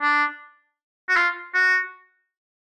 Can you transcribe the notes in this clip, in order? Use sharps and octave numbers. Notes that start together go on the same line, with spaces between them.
D4
F#4
F4
F#4